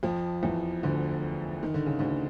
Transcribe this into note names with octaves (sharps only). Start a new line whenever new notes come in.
F2 F3
E2 E3
D2 D3
D#3
D3
C#3
D2 D3